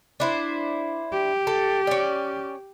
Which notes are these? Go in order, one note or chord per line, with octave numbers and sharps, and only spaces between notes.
D4 E4 C5
G4
A4
C#4 D5